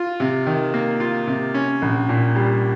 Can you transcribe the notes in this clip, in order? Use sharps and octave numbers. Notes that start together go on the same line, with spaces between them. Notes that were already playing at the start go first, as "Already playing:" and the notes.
Already playing: F4
C3
D#3
A#3
F4
C3
C#4
A#1
A#2
G3